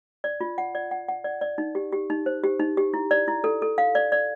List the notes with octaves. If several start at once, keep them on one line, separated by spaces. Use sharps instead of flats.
D5
F4
F#5
D5
F#5
F#5
D5
D5
D#4
G4
G4
D#4
C5
G4
D#4
G4
E4
D5
E4
A4
A4
F5
D5
D5